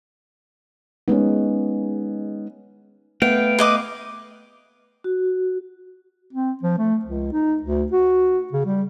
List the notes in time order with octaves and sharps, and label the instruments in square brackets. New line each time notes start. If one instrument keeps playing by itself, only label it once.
[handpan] G#3 D#4 [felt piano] B3 C#4
[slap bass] A3 [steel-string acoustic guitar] B3 [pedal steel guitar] F5 G5
[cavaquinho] B4 D#5 D6
[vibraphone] F#4
[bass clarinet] C4
F3
A3
C#2
D#4
D2
F#4
C#3
G3